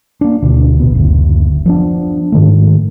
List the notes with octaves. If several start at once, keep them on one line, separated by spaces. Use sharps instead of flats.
A#3 D4
D2 B2
A1 B2 B3
F#1 D2
F3 B3 D4
G#2 D#3 A3